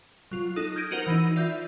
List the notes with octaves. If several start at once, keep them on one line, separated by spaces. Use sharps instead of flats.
F#3 F4
D#4 A4 D#6 F#6
F6 G6 G#6 A#6 D7 D#7
D#4 F#4 A#4 C5 F#5
E3 D#4
F4 D5 E5 G6